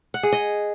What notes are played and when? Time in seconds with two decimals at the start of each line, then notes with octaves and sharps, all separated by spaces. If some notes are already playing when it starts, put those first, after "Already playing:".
0.14 F#5
0.23 G#4
0.32 D#5